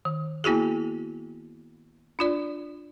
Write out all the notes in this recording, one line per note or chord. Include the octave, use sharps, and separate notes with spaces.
D#3
A#3 B3 E4 F#4 G#4
D4 F4 D5